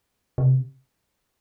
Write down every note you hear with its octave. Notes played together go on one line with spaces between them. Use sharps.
C3